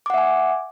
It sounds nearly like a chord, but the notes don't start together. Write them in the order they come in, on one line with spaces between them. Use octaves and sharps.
D6 F#5 E5 G#5